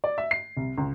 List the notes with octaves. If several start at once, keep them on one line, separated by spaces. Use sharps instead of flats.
D5
E5
C7
C2
C#2